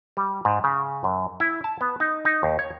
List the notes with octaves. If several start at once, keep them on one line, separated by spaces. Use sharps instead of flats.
G3
G#2
C#3
F#2
E4
A5
B3
D#4
D#4
D#2
C#5